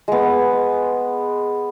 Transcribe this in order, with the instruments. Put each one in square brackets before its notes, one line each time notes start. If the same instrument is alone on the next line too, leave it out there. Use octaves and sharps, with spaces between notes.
[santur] G#3 B3